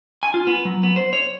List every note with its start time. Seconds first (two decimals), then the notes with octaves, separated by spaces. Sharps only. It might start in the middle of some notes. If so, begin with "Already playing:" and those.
0.23 G#5
0.34 F4
0.47 B3
0.65 F#3
0.83 B3
0.96 C5
1.13 C#5